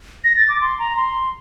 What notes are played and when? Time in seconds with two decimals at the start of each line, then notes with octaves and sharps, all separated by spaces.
0.24 A#6
0.36 A6
0.49 D6
0.61 C6
0.79 A#5
0.97 C6